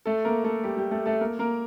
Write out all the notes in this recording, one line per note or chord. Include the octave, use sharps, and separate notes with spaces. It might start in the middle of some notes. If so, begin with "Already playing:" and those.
A3 A4
A#3 A#4
A3 A4
G3 G4
G3 G4
A3 A4
A3 A4
A#3 A#4
A#3 A#4